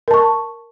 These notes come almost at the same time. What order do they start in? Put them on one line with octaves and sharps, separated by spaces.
A#4 A5 C#6